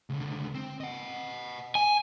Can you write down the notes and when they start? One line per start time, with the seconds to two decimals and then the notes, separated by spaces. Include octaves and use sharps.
0.10 C#2 D3
0.55 C4
0.81 D#5 F#5
1.75 G#5